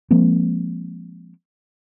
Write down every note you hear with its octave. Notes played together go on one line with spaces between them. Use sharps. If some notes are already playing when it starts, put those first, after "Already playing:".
F3 G#3 A#3 C4